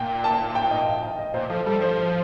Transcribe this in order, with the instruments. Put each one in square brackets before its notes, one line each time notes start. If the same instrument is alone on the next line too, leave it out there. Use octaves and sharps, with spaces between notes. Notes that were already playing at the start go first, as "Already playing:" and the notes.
Already playing: [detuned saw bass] A#2 [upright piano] G5
[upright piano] A5
G5
D#5
F5
G5
D#5
[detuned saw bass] A#2 [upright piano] C5
[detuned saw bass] F3 [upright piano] A4
[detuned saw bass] G3 [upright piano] A4
[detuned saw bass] F3 [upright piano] C5